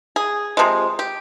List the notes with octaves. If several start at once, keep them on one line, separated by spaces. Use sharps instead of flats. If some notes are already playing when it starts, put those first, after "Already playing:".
G#4
C3 F3 G#3
G4